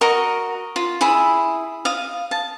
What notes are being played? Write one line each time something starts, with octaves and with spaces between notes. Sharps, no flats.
F#4 A#4 D#5 C#6
F4
E4 G#4 B5
F5 D#6
A5